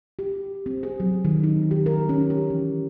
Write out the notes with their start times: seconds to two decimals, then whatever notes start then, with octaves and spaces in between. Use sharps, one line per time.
0.19 G4
0.66 C4
0.83 G#4
1.00 F#3
1.25 D#3
1.44 D#4
1.71 G4
1.86 A#4
2.09 C#4
2.30 G4
2.50 E3